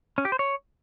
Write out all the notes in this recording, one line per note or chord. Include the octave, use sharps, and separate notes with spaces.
C#4
G4
C5
C#5